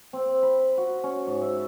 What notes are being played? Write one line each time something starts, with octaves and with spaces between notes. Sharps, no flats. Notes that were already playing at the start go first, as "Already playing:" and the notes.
C4
B5
F#4
C#4
G#2
E5